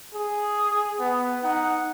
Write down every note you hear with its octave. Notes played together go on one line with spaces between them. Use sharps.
G#4
B3
D#4 F#5